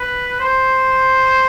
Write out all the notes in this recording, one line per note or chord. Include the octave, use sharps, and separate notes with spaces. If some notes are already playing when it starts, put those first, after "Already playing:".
Already playing: B4
C5